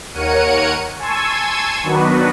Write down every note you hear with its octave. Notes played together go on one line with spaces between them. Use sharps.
D#2 A#4 C#5 F#5 C#7 D#7
G#5 A5 C6 C#6 E6 G#6
D#3 F#3 B3 D4 F#4 B4